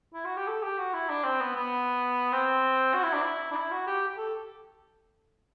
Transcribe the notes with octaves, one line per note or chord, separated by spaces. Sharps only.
E4
F#4
G4
A4
G4
F#4
E4
D4
C4
B3
B3
C4
F#4
E4
D4
E4
D4
E4
F#4
G4
G4
A4